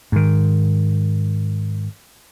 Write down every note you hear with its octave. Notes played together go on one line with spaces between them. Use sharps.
G#2 D#3